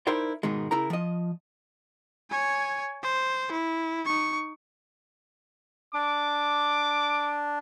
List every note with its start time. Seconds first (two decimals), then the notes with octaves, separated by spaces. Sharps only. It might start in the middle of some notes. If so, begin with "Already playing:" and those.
0.07 D#4 E4 A#4 C5 D5
0.43 G#2 B2 D#3 G#3
0.71 C#3 E4 A#4 A#5
0.90 F3 D#5
2.30 C#5 G#5
3.03 C5
3.52 E4
4.05 D#4 C#6
5.94 D4 D6